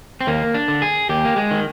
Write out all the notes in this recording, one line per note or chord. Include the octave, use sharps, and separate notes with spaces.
C4
D#2 A#3
D4
D3
G#4
D#2 G4
A#3
G#3
D#3